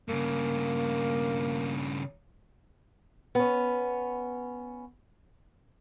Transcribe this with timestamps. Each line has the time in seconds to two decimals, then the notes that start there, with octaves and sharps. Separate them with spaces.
0.09 G2 C#3 A#3
3.35 B3 C#4